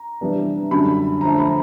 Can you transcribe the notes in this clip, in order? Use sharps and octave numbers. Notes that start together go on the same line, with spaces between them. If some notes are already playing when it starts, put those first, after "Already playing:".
Already playing: A#5
C3 E3 G3 B3 D4
F#2 D3 G3 B5
D3 F3 A3 A#5
B5